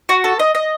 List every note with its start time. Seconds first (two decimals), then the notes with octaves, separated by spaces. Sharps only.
0.09 F#4
0.24 A4
0.39 D#5
0.55 D#5